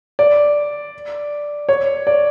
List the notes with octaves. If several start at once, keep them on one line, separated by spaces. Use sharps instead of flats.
D5
C#5
D5